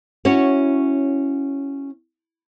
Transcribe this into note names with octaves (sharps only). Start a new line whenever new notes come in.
C#4 E4 F#4 C#5